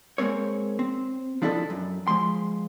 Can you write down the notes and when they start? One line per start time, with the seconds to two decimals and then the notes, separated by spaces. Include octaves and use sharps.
0.18 G#3 A#3 C4 C#5
0.79 C4
1.42 F3 D4 E4 F#4 A4 D#5
1.70 F#2
2.07 F3 G#3 C6